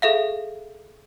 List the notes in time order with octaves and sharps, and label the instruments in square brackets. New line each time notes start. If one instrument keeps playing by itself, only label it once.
[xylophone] G#4 A4 E5 F5